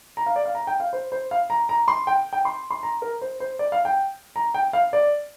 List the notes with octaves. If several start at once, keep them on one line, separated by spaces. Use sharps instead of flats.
A#5
F5
D5
F5
A#5
G5
F5
C5
C5
F5
A#5
A#5
C6
G5
G5
C6
C6
A#5
A#4
C5
C5
D5
F5
G5
A#5
G5
F5
D5